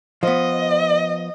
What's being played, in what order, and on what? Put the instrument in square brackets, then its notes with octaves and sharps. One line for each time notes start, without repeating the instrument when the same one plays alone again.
[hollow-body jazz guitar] F3 B3 [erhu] D#5